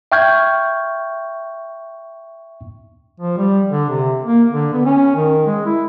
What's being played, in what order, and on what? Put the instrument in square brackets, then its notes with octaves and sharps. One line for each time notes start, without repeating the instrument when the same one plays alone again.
[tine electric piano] E5 G5 C#6 F6 G6 G#6
[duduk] F3
G3
D3
C3
A#3
D3
B3
C#4
D#3
G#3
E4